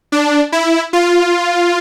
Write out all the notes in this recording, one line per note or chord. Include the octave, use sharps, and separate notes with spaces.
D4
E4
F4